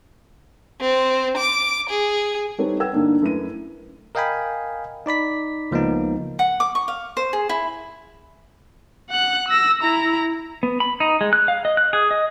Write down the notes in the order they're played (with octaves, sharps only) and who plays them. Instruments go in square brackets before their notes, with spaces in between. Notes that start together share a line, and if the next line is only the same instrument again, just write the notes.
[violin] C4
D6
G#4
[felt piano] G3 C4 D#4 A4 B4 C#5
A4 B4 F#5 G5 E6 G#6
D2 G2 A#3 D4 D#4
F#2 A3 E4 B4 D#7
[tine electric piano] A#4 D#5 F5 G5 G#5 B5
D#4 D5 B5 B6
C#2 F3 A#3 B3 D#4
[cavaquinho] F#5
D6
C#6
F5
C5
G#4
E4
[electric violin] F#5 F#6
E6 A#6
E4 A#5
[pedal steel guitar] B3
B5
D#4
G#3
F#6
F5
D#5
F#6
G#4
D#5